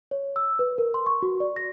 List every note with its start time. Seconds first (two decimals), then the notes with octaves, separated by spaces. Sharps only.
0.11 C#5
0.36 E6
0.59 B4
0.78 A#4
0.94 C6
1.06 C#6
1.22 F#4
1.40 D5
1.56 A#6